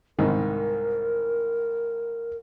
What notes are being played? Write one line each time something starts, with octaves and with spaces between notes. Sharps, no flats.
C2 G#2 D#3 A#4